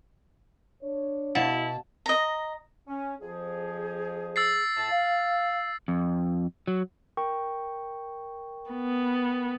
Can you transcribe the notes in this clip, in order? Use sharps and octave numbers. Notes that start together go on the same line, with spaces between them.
D4 C#5
B2 E4 F5 F#5 A5 A6
D#5 A#5
C#4
F2 F3 G#4
E6 A6 C7
A2 A5
F5
F2
F#3
A#4 G5 C#6
B3